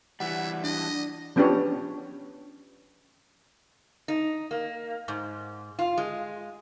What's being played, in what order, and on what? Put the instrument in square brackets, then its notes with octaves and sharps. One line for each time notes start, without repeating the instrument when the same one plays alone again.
[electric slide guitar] E3 G3 [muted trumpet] E5 [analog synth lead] F#5
[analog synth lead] D4 [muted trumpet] D#5
[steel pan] F3 B3 C#4 D4 G4 C#5
[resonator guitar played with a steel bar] D#4
A#3
G#2
F4
G#3